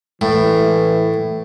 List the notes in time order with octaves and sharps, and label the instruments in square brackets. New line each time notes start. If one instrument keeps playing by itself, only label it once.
[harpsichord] A2 [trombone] E3